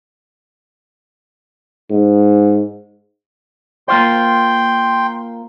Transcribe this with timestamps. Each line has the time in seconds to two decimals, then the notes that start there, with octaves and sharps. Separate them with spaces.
1.91 G#2
3.88 A#3 F4 C5 G5 C6